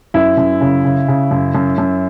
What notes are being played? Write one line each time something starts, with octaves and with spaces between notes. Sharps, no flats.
F#2 E4
F#2
C#3
C#3
C#3
F#2
F#2
F#2